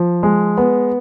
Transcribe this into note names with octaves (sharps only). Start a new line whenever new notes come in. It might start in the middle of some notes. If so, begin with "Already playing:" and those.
Already playing: F3
G#3
B3